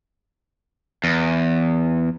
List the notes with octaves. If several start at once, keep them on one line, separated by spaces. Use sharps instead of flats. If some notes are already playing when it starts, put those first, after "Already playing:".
E2